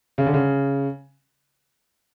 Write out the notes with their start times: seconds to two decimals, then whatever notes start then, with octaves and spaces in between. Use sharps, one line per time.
0.18 C#3
0.27 D3
0.34 C#3